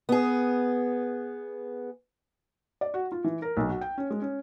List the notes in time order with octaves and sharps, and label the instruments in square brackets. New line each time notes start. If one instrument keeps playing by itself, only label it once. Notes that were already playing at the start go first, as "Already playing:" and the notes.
[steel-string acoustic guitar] B3 G#4
[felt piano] D5
F#4
F4
E3
A#4
B1
F#4
G5
C#4
G#3
C#4